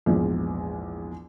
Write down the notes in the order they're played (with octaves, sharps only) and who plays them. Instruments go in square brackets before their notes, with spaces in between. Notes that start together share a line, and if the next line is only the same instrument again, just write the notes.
[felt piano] A#1 E2 G#2